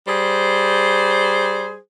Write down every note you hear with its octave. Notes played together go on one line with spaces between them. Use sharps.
G3 G#4 C5